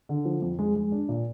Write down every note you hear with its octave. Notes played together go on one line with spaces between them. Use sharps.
D3
F3
F2
G#3
G#3
D4
A#2